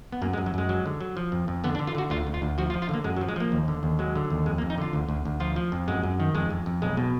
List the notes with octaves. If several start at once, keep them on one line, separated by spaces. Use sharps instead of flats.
B3
F#2 A#3
G#3
F#2
F#3
F#2 G#3
F#3
D3
F#3
F3
F2
F2
D3 B3
D4
D3
F4
D3 F#4
D2 F4
D2
F4
D2
F3 F#4
F4
F3
F4
D3 A#3
F#2 G#3
F#3
F3
G#3
F3 A#3
D#2
D3
D#2
F#3 G#3
D3
D#2
F2 G#3
A#3
F2
D#4
D3 F4
D2
D2
D2
F3 F4
F3
F2
F#2 G#3
F#2
D#3
F2 G#3
F2
F2
B1 G#3
B2